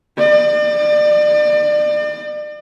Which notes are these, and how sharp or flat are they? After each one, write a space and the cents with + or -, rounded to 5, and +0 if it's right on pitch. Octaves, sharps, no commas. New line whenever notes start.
D5 +30